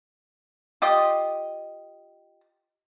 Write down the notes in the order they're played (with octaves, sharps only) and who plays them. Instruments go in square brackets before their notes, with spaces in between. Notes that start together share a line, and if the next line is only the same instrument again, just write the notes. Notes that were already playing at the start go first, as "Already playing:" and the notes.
[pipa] F4 G4 D#5